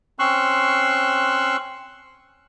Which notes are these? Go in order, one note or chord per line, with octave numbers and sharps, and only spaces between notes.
C4 C#4 C6 C#6 E6 F#6